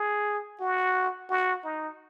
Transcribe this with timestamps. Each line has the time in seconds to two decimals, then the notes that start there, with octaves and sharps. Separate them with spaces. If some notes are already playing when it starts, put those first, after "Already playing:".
Already playing: G#4
0.60 F#4
1.30 F#4
1.64 D#4